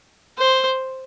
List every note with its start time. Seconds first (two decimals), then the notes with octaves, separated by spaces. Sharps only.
0.38 C5